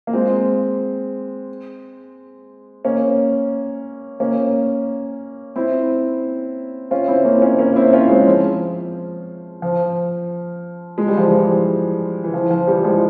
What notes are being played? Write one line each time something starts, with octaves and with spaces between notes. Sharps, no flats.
A#3
G#3 C4
A#3 C#4
A#3 C#4
C4 E4
C#4 F4
C4 E4
A#3 C#4
A#3 C#4
A#3 C#4
C4 E4
C#4 F4
G#3 C4
F3
F3
G#3
G3
F3
E3 G3
E3
F3
F3
E3 G3
F3 G#3